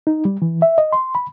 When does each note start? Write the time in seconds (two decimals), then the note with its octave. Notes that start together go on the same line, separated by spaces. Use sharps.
0.07 D#4
0.25 G3
0.42 E3
0.62 E5
0.78 D#5
0.92 C6
1.15 B5